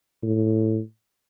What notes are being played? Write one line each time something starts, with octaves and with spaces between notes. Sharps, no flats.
A2